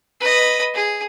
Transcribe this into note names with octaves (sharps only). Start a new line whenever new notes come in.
B4 D#5
G#4